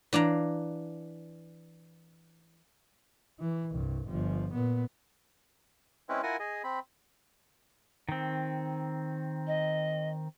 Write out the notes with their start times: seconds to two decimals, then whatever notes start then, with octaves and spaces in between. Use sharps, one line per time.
0.13 E3 D4 F5 A#5
3.40 E3
3.72 C2 G2
4.09 G1 F3
4.52 A#2 B3
6.09 G#3 C4 C#4 E4 B4
6.23 E4 F4 A#4 F#5 G#5
6.39 G#4 D#5
6.64 C4 B5
8.09 D#3 C4
9.47 D#5